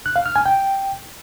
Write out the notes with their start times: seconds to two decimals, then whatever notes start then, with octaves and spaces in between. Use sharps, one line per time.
0.06 F#6
0.16 F5
0.26 F6
0.36 G#5
0.46 G5